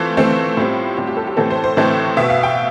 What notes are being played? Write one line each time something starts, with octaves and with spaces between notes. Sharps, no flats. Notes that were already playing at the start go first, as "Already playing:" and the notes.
Already playing: E3 A3 C4 F4
E3 A3 C4
A2 G3 C4
A2 G3 C4 G4
G4
A4
G4
A2 E3 A3 C4 A4
C5
C5
A2 E3 A3 C4
B2 B3 E5
F5
G5